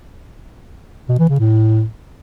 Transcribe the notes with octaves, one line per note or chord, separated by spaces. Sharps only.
B2
E3
C#3
A2